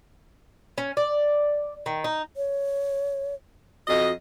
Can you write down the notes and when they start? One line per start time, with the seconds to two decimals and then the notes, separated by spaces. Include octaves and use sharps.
0.78 C#4
0.97 D5
1.86 D#3
2.04 D#4
2.37 C#5
3.88 F2 F#4 D#5